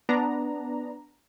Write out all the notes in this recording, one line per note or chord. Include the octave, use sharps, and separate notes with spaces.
B3 D4 A#5